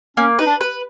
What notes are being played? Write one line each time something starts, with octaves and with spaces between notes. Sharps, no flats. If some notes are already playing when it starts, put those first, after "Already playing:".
A#3 C#4
D#4 B4
D4
B4